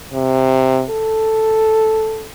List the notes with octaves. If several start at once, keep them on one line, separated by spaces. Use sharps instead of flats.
C3
A4